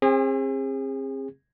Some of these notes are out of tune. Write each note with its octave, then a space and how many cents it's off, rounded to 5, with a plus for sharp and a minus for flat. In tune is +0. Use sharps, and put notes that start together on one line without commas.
C4 +35 G#4 -35